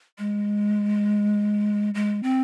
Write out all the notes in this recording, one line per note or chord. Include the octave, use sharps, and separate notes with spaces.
G#3
G#3
C4